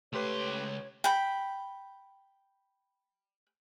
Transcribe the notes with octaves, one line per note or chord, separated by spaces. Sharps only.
C#2 A3 G4 B4 C#5 C6
G5 B5